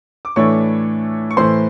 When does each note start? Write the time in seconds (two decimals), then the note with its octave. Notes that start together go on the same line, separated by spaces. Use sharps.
0.25 D6
0.36 A2 E3 A3 D4 C#5 C#6
1.31 C#6
1.37 A2 E3 A3 C5 C6